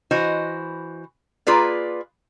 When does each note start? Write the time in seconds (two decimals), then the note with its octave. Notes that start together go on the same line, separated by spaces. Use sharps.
0.11 E3 F#4 C5 D#5
1.47 A#3 F4 G#4 B4 D5